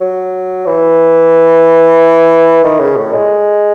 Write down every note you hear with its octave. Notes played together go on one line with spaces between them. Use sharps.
F#3
E3
D#3
C#3
A2
G#3